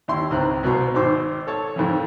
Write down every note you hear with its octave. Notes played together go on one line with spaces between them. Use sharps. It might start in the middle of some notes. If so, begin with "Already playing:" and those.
D#2 E4 C6
C#2 G#2 C4 A#5 F#6
C2 B2 B4 C5 A#5
G#1 G#2 C5 D6 E6
A4 C#5 A5
F2 G#2 D#3 E3